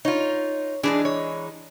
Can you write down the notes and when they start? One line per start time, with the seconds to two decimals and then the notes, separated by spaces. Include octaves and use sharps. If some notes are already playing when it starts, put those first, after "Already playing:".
0.05 D#4 F4 C#5
0.83 E3 G#3 D4 D#4 G#4
1.05 C#5